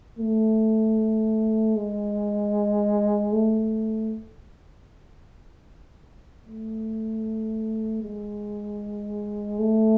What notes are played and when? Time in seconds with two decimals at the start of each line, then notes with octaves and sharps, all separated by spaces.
0.19 A3
1.76 G#3
3.33 A3
6.46 A3
8.03 G#3
9.59 A3